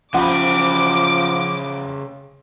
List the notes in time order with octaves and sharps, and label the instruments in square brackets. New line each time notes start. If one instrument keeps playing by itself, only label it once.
[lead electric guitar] C#3 G4 [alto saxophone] F3 [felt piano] F#5 B5 [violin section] D6